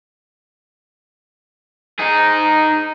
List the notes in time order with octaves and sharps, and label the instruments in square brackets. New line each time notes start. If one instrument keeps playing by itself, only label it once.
[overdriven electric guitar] D#4 G#4